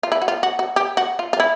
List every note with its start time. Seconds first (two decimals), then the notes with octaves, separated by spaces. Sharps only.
0.03 F4
0.12 E4
0.22 F#4
0.28 F4
0.43 F#4
0.59 F#4
0.76 G4
0.97 F#4
1.19 F4
1.33 F4
1.40 E4